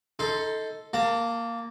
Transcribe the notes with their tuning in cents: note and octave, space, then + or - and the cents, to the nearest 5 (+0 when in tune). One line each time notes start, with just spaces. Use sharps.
D#4 +25 A4 +0 C6 +0
A#3 -5 A5 +25